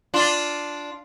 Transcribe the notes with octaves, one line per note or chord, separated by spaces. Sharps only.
D4 F4